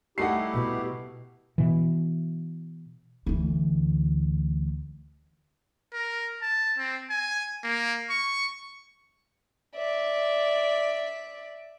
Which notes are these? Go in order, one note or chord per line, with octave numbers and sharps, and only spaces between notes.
G3 A3 D#4 E4 G4 F#5 C7
B2
B2 E3
D2 E3
A#4
A5
C4
G#5
A#3
C#6
D5 E5